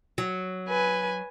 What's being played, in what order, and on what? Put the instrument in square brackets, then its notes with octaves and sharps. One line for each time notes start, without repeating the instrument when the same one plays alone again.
[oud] F#3
[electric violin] B4 G#5